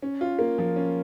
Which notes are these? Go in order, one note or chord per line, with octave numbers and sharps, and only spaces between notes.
C#4
F4
A#3
F3
C#4